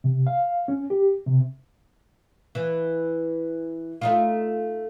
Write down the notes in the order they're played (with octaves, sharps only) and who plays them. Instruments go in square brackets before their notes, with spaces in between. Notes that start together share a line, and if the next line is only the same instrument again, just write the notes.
[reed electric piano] C3
F5
C#4
G4
C3
[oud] E3
A3 D#4 F4